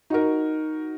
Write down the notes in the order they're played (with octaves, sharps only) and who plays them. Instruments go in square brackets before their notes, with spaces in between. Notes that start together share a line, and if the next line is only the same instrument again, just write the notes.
[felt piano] D#4 F#4 A#4